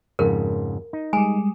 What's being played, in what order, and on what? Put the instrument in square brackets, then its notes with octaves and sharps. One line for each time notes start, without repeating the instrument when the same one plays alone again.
[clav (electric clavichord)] F2 G#2 C#3 [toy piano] A#4
[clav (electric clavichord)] D#4
[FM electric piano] G3 G#3 [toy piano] G#5